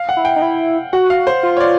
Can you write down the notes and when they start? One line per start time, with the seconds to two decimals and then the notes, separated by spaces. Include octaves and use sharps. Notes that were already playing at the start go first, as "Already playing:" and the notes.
Already playing: F5
0.09 F#5
0.17 E4
0.25 G5
0.36 D#4
0.42 E4
0.93 F#4 F#5
1.10 F5
1.27 C5
1.43 F4
1.57 C#5
1.60 D5